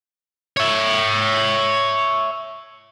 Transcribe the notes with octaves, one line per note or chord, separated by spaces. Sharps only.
C#5 E5